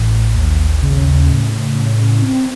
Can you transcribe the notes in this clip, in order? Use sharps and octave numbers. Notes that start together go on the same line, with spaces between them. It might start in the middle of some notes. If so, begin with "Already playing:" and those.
Already playing: A1 A2
D#2
C#3
A2
C#4
C4